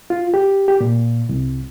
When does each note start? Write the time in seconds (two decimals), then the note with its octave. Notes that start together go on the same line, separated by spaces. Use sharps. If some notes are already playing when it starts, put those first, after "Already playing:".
0.10 F4
0.34 G4
0.68 G4
0.81 A#2
1.29 C2